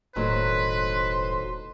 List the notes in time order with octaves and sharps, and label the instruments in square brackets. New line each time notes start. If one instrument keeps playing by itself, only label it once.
[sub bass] E1 [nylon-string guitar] A2 D#3 F#3 [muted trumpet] B4 [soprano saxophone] C5